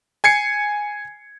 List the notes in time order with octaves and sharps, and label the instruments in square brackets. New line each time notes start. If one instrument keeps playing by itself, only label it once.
[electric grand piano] G#5 G#6 C7 C#7